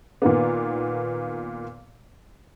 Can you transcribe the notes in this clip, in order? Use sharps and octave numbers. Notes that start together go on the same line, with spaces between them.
A#2 D#3 A#3 B3